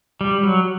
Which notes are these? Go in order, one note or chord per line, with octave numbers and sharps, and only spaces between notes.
G3
F#3